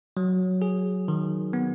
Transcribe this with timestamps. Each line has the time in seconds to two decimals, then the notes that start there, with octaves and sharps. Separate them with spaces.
0.17 F#3
0.62 G#4
1.08 D#3
1.53 B3